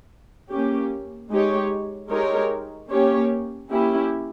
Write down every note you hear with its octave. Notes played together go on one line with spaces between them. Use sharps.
A#3 C#4 G4
G#3 D#4 G4 C#5
G#3 D#4 G4 A#4 C#5
A#3 C#4 G4 C#5
A#3 C#4 E4 G4